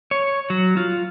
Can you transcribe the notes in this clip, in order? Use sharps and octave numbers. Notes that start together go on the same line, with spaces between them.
C#5
F#3
F4